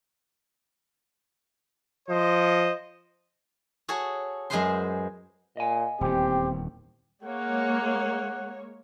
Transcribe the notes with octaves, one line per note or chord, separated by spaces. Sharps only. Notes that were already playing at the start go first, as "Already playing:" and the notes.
F3 C5 D#5
F#4 G#4 A4 C#5
F#2 G#3 G#4 B4 C5 C6
A#2 D#5 G#5
D#1 E2 C4 G4
G#3 A#3 C#5 F#5